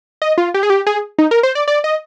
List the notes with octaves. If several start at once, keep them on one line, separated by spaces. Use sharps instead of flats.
D#5
F4
G4
G#4
G4
G#4
D#4
A#4
C5
D5
D5
D#5